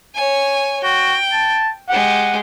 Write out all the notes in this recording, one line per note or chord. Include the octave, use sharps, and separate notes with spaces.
C#5 G#5
F#4 G5
A5
G#3 G4 F#5